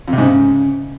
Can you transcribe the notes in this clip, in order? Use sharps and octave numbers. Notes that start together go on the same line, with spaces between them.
F2
C3
G#2
C#3